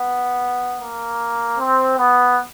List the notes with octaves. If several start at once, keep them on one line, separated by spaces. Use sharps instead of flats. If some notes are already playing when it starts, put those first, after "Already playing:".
Already playing: B3
A#3
C4
B3